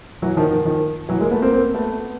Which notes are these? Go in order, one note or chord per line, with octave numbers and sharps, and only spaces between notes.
E3 F#3
D#3 F3
D#3 F3
D#3 F3
E3 F#3
G#3 A#3
A3 B3
A#3 C4
A#3 C4
A3 B3